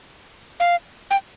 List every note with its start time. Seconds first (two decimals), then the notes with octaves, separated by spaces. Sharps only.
0.60 F5
1.11 G5